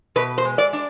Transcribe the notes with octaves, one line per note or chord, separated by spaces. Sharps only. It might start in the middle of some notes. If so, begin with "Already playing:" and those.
B2 B4
C5
G#3
D5
D4